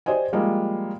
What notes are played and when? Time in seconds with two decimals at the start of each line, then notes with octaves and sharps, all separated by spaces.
0.06 G4 C5 D5 D#5 G#5
0.33 F3 G3 G#3 A#3